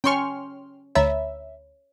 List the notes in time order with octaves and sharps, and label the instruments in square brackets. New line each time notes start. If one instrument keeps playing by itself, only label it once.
[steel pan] C#4 C#6 [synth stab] G5 C6 F6
[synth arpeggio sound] D2 A#5 B5 [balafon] C#5 [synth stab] E5